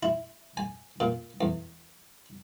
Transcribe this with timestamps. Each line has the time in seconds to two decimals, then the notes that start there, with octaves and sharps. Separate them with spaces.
0.03 E4
0.57 G#5
1.00 A#2
1.41 E2